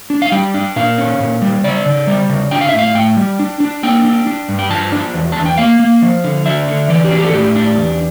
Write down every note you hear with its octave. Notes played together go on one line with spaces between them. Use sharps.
D4
F5
G3 G5
D4
A#2 F5
C#4
A#2
G3
C#3 D5
C#3
G3
C#3
D4 G5
F5
E5
A2
F5
A2 G5
G3
D4
D4
A#3 G5
D4
D4
G2
G5
F3 A5
D4
E2
E2 A5
G5
A#3 F5
A#3
F3
D3
D4 E5
D3
E3 D5
G4
D4
G4
A4
A2 G4
D4
E2